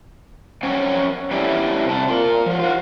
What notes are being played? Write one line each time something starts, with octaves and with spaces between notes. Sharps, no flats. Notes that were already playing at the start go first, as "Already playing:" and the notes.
F3 F#3 C4 C#4 C#5
G3 A3 B3 C#4 D4 E4
C3 A5
F4 A#4
F3 F#3
F4 F#4